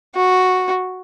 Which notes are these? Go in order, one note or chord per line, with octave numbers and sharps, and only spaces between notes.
F#4